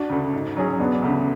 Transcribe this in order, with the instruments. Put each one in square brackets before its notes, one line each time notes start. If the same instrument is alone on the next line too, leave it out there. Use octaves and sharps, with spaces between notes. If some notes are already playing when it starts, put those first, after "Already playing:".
Already playing: [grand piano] D4 F#4
[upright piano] D2 C#3
G#2
F#3 C#4 G#4
[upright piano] E1 [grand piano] B3 D4
[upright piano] D2 C#3